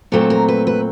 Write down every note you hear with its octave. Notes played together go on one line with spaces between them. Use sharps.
A#2 F#3 A3 C4 A4
A#4
B4
B4